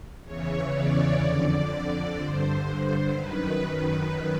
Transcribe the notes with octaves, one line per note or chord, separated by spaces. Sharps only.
E2 C#3 E3 C#5
D5
F2 D3 D5
G2 D3 C5
F#2 D#3 B4
B4